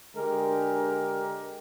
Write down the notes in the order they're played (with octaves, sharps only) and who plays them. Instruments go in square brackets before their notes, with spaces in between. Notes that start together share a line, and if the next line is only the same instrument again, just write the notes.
[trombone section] D3 G#3 D4 G4 G#4 A#4